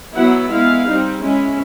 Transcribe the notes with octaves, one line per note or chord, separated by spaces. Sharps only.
F#3 B3 E4 F#5
G#3 B3 E4 F5
G3 C4 D#4
G#3 C#4 E4